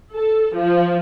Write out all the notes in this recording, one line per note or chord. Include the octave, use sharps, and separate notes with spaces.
A4
F3